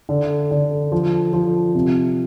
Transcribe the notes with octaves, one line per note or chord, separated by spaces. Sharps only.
D3
D3
F3
F3
C3